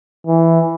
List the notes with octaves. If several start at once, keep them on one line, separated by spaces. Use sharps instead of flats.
E3